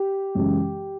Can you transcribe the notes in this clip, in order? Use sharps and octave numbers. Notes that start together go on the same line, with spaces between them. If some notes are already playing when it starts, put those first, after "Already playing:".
Already playing: G4
F#2 C#3 E3 G#3